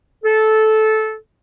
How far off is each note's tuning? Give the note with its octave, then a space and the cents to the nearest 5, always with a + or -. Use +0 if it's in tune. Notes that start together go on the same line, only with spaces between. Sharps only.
A4 -15